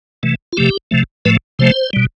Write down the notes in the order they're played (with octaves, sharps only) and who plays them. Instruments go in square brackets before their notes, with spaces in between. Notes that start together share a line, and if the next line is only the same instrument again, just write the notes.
[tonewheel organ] C3 E3 A3
F4
C3 F3 A3 G4
C3 F3 A3
A2 F3 A3 B4
C3 F3 A3 C5
B2 G3